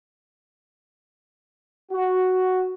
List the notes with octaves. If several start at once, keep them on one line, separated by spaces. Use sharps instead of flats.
F#4